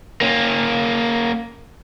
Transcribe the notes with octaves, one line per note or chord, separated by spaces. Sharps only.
A#3 C#4